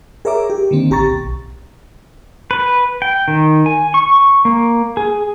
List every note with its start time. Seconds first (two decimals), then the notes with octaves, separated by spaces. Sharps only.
0.25 G#4 A#4 C#5 E5 A#5 D6
0.50 G4
0.71 D3 D#3 A#3 C4
0.90 A1 G4 A#5 C#6 A6
1.11 B1
2.51 B4
3.02 G5
3.28 D#3
3.66 G#5
3.94 C#6
4.45 A#3
4.97 G#4